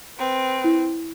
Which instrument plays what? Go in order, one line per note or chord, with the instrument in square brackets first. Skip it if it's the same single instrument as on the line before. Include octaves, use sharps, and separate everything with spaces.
[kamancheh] C4 B4
[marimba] E4